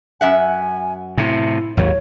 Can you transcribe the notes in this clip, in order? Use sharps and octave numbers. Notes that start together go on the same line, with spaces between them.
F#2 E5 F#5 G#5
A2 C3 E4
G#1 D#2 F#3 C#5